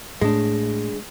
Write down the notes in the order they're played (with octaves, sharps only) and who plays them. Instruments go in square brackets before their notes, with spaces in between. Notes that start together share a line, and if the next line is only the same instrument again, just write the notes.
[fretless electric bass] A2 [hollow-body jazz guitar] G#3 D4